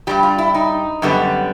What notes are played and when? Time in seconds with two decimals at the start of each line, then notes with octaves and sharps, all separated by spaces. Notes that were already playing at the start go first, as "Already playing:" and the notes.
0.07 G2 E3 G3 G4
0.23 F4
0.38 E4
0.54 D#4
1.02 F#2 D3 G3 B3